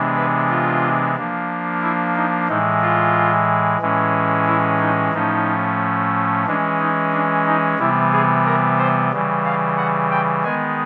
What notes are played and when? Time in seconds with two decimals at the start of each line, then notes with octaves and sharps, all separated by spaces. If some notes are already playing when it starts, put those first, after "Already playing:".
Already playing: C3 E3 G#3 B3 D4
0.16 B4
0.49 F4
1.15 F3 A#3 D4
1.82 E4
2.16 D#4
2.48 A2 E3 G#3 D#4
2.82 F4
3.81 A2 E3 G#3 C#4
4.47 E4
4.80 D#4
5.13 A2 F3 A3 C#4 D#4
6.46 E3 G#3 C#4 D4
6.79 D#4
7.12 D4
7.46 D#4
7.79 C3 E3 G3 B3 E4
8.13 G#4
8.46 A#4
8.78 C5
9.12 C#3 E3 G3
9.45 F5
9.78 F#5
10.11 G5
10.44 D#3 G#3 B3 G#5